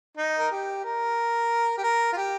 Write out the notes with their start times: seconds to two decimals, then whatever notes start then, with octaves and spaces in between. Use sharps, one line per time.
0.17 D#4
0.39 A#4
0.52 G4
0.84 A#4
1.78 G4
1.84 A#4
2.13 F4
2.17 G4